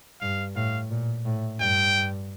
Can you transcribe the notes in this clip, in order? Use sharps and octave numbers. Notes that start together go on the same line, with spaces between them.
G2 F5
A2 F5
A#2
A2
G2 G5